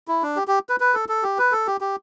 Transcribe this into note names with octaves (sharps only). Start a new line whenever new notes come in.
E4
D4
G4
G4
B4
B4
A4
A4
G4
B4
A4
G4
G4